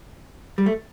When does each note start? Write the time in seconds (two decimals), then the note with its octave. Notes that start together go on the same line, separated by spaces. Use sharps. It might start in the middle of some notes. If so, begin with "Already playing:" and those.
0.58 G3
0.66 A3